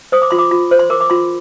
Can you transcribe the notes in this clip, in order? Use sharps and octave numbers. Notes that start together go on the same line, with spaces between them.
C5 D#6
D6
F4 C6
D6
F4
C5
C6
A#4 D6
D6
F4 C6